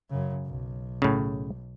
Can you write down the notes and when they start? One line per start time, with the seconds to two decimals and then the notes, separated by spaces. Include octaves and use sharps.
0.10 F#2 C#3
0.46 B1
1.02 A2 C#3